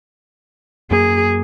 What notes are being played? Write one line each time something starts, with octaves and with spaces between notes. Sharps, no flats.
F#2 A#3 G#4